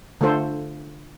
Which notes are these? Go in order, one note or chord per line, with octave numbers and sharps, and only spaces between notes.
D3 A3 F4 A4 C5